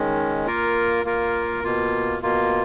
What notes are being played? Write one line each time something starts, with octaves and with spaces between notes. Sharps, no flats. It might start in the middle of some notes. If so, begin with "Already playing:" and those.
Already playing: D#3 G#3 C#4
A#3 F4 A#4
A#3 F4 A#4
B2 A#3 F4
B2 A#3 F4